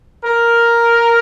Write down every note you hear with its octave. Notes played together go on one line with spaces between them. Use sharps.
A#4